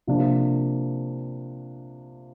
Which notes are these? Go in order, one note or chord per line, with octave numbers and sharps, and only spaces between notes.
C3 F3 A#3 D4